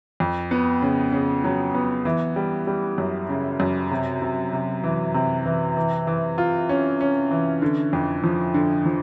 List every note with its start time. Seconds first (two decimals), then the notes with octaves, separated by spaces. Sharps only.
0.20 F2
0.51 B3
0.82 C#3
1.12 C#3
1.44 F#3
1.75 B3
2.05 E3
2.36 G3
2.67 G3
2.98 F#2
3.29 C#3
3.60 F#2
3.91 C3
4.22 C3
4.53 C3
4.83 E3
5.14 C3
5.46 E3
5.76 E3
6.07 E3
6.38 F4
6.69 C#4
7.01 C#4
7.31 E3
7.62 D3
7.93 F2
8.24 F3
8.54 D3
8.86 F3